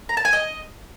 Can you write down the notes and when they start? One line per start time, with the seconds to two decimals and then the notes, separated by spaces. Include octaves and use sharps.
0.09 A#5
0.17 A5
0.25 G#5
0.33 D#5